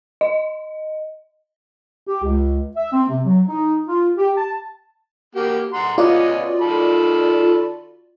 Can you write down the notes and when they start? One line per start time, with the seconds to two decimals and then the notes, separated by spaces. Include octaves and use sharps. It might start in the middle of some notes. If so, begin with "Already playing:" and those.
0.21 D#5
2.08 G4
2.23 C#2
2.76 E5
2.93 C4
3.10 C3
3.26 F#3
3.48 D#4
3.88 F4
4.17 G4
4.37 A5
5.35 A#3 F#4 G4
5.74 F#5 A#5 C6
5.98 B3 C#4 F4 F#4 D5 D#5
6.61 D#3 A4 B5